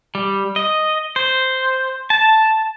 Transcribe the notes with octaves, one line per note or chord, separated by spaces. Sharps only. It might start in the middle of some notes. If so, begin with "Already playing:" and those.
G3
D#5
C5
A5